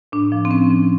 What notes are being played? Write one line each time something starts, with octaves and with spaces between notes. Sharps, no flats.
A2 D4
F3
C4
A2 C#4
F3